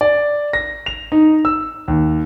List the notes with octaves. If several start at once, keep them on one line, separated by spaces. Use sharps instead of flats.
D5
A#6
F7
D#4
E6
D#2